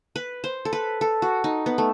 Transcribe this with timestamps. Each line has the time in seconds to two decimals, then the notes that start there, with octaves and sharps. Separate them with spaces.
0.16 B4
0.44 C5
0.65 A4
0.73 B4
1.01 A4
1.22 F#4
1.44 D#4
1.66 B3
1.78 A3